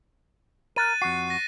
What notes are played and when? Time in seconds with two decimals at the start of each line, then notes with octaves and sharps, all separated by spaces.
0.76 A#4 F#6 A6 D#7
1.02 F2 F#4 C7
1.30 A#6 D#7